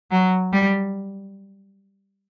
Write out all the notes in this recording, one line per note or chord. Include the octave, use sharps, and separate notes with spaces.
F#3
G3